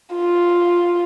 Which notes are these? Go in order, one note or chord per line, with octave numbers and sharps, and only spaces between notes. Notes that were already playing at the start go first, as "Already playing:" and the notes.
F4